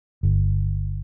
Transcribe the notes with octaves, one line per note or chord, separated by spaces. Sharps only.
G1